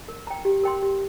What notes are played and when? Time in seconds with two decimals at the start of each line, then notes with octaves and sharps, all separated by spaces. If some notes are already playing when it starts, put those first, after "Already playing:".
0.08 A#4
0.27 G5 A#5
0.45 G4
0.63 A#4 G5 C6
0.82 G4